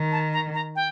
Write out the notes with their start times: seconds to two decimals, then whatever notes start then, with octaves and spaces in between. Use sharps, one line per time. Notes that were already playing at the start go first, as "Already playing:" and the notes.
Already playing: D#3
0.12 A5
0.33 A#5
0.54 A#5
0.75 G5